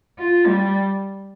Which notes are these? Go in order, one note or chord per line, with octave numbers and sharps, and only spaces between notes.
F4
G3